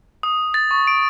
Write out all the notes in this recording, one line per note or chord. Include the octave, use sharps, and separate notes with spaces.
D#6
A6
C#6
D7